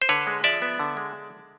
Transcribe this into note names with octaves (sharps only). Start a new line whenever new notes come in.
C5
D3 B4 C#5
G#3
F3 D5 E5
B3
D3
G#3